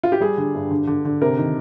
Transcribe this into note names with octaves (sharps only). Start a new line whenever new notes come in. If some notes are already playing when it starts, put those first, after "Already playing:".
F4
G4
G3 G#4
D3
G2
D3
D3
D3
C3 A#4
D#3